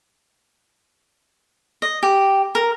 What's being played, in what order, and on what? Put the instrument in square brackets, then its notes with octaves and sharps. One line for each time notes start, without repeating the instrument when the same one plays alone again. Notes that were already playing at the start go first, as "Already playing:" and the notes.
[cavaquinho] D#5
G4
A#4